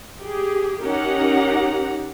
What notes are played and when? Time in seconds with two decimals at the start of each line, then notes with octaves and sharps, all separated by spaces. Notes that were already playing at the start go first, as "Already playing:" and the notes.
0.20 G4 G#4
0.83 C#4 D#4 G4 A#4 F#5 A#5